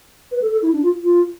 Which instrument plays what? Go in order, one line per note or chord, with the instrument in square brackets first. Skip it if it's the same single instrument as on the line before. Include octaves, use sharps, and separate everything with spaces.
[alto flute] B4
A4
A4
E4
D4
F4
F4